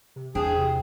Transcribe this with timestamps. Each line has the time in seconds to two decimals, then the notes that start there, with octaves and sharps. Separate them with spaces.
0.16 C3
0.35 E2 C4 D4 G#4
0.57 C3